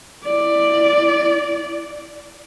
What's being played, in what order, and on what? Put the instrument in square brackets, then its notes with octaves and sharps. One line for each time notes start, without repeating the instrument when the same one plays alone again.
[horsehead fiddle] E4 D5